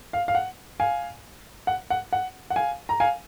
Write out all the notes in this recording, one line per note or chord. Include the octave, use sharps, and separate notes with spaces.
F5
F5
F#5
F5 G#5
F#5
F#5
F#5
F#5
F5 G#5
A#5
F5 G#5